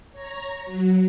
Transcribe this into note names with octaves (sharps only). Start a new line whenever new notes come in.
C#5 A#5
F#3